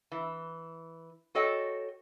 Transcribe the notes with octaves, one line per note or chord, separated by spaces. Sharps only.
E3
F#4 A4 C#5 D#5 G5